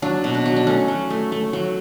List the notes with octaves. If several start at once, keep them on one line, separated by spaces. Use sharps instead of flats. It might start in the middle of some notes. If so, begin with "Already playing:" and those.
F#3 D4
B2
D4
F#3
D4
A3 C#4
F#3
A3
A3
F#3